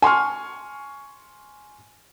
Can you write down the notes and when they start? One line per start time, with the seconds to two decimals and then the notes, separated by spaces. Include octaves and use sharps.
0.02 G#5 C6 C#6 F6